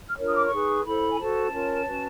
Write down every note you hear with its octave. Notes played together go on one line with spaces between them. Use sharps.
F6
D4 F4 A#4 C#5
D#6
D6
C#6
D#4 G#4 B4
E4 A4 C5 B5
G#5
F#4 A4 C5 A5
C#4 F4 A#4 C#5
C#4 F#4 B4